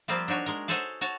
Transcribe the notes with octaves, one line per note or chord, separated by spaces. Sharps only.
F3 G3 A#3 C4 F4
D4 D#4 F#4 C#5
G#3 A#4
G#4 A4 C5 C#5 D#5 F#5
F#4 C#5 A5